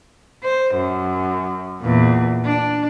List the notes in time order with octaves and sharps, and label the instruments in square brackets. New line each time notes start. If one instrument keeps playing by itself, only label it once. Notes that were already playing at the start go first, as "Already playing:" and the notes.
[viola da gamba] C5
F#2
E2 A#2
D4